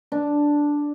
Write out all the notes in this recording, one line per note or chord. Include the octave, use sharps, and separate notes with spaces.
D4